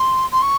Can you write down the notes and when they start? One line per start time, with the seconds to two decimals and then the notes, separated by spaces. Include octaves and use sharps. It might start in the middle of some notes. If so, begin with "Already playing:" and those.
Already playing: C6
0.31 C6
0.42 C#6